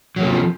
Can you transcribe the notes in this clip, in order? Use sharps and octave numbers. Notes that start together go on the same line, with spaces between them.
C3 F3 F#3 A#3